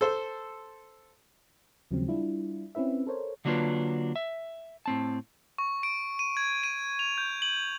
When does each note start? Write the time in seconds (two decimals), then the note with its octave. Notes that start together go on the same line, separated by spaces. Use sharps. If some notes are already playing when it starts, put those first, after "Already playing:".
0.01 A4 C5
1.91 D#2 C#3 F3 F#3 G#3 C4
2.08 G3 D4 E4 F4
2.75 C4 C#4 E4 B4 E5
3.07 A4 A#4 C5 C#5
3.45 D3 F#3 A#3 D4 F4 B4
4.16 E5
4.86 A2 C4 A5
5.58 C#6
5.83 D7
6.19 D#7
6.37 G#6
6.64 D#7
6.99 F7
7.18 G6
7.42 F#7